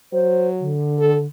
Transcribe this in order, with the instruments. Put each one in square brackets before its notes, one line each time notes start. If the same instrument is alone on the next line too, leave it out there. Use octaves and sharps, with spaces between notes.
[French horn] F#3 [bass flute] C5
[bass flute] D3
[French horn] A4